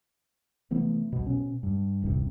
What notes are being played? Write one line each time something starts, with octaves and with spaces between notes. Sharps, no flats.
C3 E3 A3 B3
B1 B2
B2 C#4
G2
D#1 C2 G2 C3